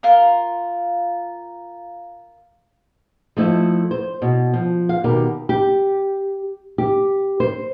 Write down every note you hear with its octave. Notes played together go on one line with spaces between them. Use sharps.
F4 A#4
F3 A3 E4 D#5 E5
C5
B2 E4
F3
F5
B2 D#3 G4 A#4
G4
G4
C5